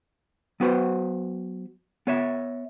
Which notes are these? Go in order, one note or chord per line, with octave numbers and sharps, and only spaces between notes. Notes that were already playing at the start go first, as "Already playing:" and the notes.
F#3 B3 F#4 B4 C5
B3 C#5 E5